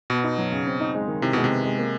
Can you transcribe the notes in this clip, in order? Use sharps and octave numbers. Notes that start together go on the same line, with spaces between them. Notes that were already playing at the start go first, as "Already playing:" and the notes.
B2 B3
D#4
F#3
C#3
C4
D#4
G#3
D#3
C3 E4
B2 G#3
C3
B3
G#3
A#3